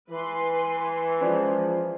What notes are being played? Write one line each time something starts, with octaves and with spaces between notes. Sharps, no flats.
E3 B4 C6
F3 G#3 C#4 C5 D5